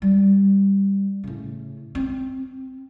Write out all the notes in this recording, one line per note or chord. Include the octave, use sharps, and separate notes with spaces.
G3
A2 C#3
C4